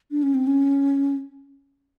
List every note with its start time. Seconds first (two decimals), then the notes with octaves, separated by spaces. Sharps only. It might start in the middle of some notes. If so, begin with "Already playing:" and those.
0.11 D4
0.23 C#4
0.34 C4
0.47 C#4